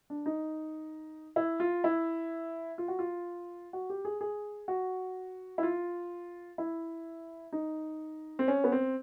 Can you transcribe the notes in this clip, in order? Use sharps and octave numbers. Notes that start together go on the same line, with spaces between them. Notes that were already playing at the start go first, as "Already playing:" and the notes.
D4
D#4
E4
F4
E4
F4
F#4
F4
F#4
G4
G#4
G#4
F#4
E4
F4
E4
D#4
C4
C#4
B3
C4